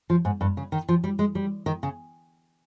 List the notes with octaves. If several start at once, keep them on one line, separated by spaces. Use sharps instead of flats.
F3
G#2
G2
C#3
D#3
F3
G3
G#3
G3
D#3
C#3